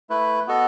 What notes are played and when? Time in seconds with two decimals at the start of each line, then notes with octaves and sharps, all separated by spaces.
0.10 A3 E4 B4
0.47 B3 F#4 A4 D#5